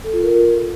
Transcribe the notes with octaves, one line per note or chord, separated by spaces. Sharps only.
A4
F4
A#4